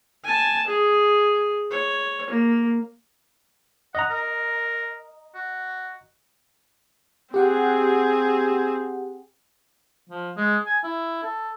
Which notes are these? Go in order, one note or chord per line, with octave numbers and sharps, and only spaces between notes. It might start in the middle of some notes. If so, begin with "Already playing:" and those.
G#5 A5
G#4
C#5
A#3
D#5 F#5 A#5
A#4
F#4
C4 G4 G#4 F#5 G5
F3
G#3
G#5
E4
A4